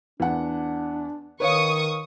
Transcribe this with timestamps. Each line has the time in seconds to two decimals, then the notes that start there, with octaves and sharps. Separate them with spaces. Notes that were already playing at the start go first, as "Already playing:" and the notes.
0.20 E2 D4 F#5
1.40 D#3 B4 C#5 F5 C#6 D#6